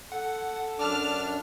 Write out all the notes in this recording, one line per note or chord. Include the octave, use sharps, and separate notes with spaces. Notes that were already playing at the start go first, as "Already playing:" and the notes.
A4 F#5
F#2 D4 A5 D6 F6